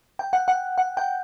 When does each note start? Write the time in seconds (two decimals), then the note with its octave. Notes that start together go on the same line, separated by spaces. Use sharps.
0.19 G5
0.33 F#5
0.48 F#5
0.78 F#5
0.97 G5